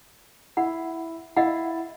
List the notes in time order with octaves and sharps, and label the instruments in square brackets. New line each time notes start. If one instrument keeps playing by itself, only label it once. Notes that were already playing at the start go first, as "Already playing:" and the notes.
[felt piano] E4 [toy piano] F#5
[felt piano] E4 [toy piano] D#5 F5 F#5